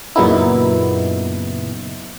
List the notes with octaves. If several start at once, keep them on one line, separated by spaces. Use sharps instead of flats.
F#2 A#2 C#3 B3 D#4 E4